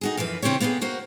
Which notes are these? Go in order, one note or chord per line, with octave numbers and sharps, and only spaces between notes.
D#4 F#4 G#4
F#2 E3 F3 B4
C#3 C4 E4 G4 C#5
A#3 B3 F4 G4 G#4
A#3 F#4 C5